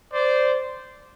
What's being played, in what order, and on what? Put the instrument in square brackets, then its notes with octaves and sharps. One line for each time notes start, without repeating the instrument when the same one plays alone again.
[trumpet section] C5 D5